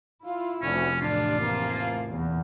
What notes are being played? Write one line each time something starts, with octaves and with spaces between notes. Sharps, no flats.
E4 F4
F1 D2 C#4
A1 D4 F4
E3 F3 A#3
E2 A#2